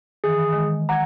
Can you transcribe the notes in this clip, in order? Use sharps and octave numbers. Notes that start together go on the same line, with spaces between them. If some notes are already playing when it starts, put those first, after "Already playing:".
D#3 E3 G#4
D#3 G#3
F#5 A#5 D6 G#6